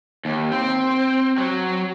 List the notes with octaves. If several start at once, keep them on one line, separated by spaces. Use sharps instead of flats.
D#2
C4
F#3